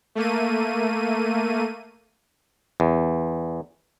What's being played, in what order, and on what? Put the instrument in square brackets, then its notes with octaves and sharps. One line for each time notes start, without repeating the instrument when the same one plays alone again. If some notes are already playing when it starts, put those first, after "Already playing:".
[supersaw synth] A3 A#3 D#7
[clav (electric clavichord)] E2